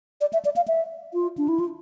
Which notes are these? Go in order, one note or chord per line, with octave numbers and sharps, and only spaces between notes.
D5
E5
D5
F5
E5
F4
D4
E4
F4